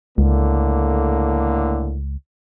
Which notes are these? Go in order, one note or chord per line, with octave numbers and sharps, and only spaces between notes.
C#2 A2 D3 A#3